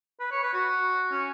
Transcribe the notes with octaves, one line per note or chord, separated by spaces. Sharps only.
B4
C#5
B4
F#4
C#4